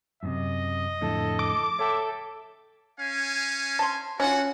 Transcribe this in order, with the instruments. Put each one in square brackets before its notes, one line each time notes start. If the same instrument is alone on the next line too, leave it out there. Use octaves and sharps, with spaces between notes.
[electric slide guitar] F#2 A2 C3 [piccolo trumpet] D#5
[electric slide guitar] F2 A2 D3 [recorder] A4
[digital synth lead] D6
[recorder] A4 [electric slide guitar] C#5 G5 [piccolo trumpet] E5
[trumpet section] C#4 F5 G#5
[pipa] A5 C6
[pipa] C#4 F4 [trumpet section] F#4 F#5